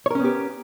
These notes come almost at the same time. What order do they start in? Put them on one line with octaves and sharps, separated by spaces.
C#5 A#4 C#4 B3 G4